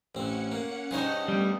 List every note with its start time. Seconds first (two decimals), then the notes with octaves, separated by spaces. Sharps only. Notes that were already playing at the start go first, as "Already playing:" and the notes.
0.15 A1 C4 C#4 F#5 C#7
0.52 A#3
0.91 G2 D#4 G#4 C5 C#5
1.28 G3 A3 B3